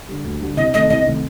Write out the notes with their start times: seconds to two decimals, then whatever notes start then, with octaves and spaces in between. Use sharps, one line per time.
0.09 D3 G3
0.24 D2
0.41 D3 G3
0.57 C2 D#5
0.73 C3 D#3 A3 D#5
0.90 C2 D#5
1.05 C3 D#3 A3